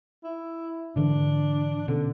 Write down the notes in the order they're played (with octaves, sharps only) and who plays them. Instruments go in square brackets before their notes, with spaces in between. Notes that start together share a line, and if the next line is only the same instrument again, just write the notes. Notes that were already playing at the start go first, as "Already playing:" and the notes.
[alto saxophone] E4
[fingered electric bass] G#2 D3 E3 [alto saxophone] D4
[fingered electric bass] B2 C#4 [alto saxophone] D3